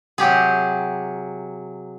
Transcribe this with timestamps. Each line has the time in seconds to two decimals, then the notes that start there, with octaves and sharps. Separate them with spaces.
0.18 C3 F#3 G4 G#4